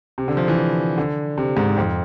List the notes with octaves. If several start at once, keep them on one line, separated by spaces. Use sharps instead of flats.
C3
D3
F3
E3
D3
C3
G#2
F2